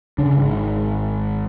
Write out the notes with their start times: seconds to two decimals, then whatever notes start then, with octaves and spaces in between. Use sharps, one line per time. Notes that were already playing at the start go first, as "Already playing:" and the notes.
0.18 C#3 D4
0.37 G#1